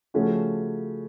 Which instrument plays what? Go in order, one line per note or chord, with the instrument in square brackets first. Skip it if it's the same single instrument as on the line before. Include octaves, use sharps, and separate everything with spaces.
[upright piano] C#3 F3 A3 C#4 F#4